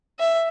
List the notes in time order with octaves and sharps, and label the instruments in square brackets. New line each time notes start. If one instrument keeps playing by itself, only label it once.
[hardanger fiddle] E5